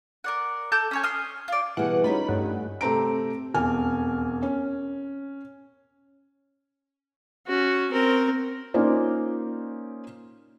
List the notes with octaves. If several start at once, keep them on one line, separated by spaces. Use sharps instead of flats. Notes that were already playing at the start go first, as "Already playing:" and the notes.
A#4 D5 F#5
A4 A5 D6 G6
C#4 C#5 G#5
C6 D#6 F6
F4 D5
B2 E3 G3 E4 G#4 F#5
C#4 D#4 F4 B5
G2 G3 A3 F#5
C3 A3 C4 A#5 D7
E1 F2 G#5 F6
C#4
C#4 F#4
C4 A#4
A#3 C#4 D#4 F4 C5 D5